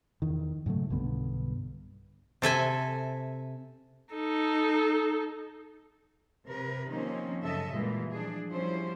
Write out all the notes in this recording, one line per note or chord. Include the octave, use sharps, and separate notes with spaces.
E2 D#3
G#2 C#3 F#3 A3
B1 G2 D3 B3
C3 A4 E5 G#5
D#4 A4
C3 A#4 B4
D#3 F3 A#3 C4 C#4 D#4
F#2 C#3 A4 D#5 E5
A#2 E3 G3 G#3
F3 D4 G#4
F3 G3 C#4 E4 C5